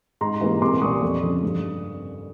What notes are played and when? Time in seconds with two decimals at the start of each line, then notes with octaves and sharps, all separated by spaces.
0.21 G#2 A#5 C6
0.41 E3 G3 A#3
0.61 C2 C6 D6
0.81 A#2 G3 A#3 C#6 D#6
1.02 F2
1.23 C#3 F3
1.43 G2